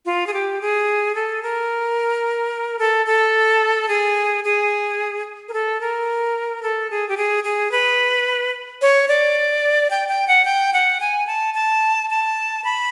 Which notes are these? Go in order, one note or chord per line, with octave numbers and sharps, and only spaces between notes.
F4
G#4
G4
G#4
A4
A#4
A4
A4
G#4
G#4
A#4
A4
A#4
A4
G#4
G4
G#4
G#4
B4
C#5
D5
G5
G5
F#5
G5
F#5
G#5
A5
A5
A5
B5